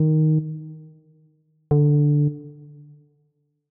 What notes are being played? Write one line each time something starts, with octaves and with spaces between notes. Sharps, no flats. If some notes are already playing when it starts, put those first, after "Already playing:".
Already playing: D#3
D3